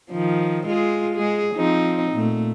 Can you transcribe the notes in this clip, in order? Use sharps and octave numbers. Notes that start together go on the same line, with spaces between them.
D#3 F3
G#3 F4 G#4
G#3 G#4
F3 C4 D#4
A#2 A3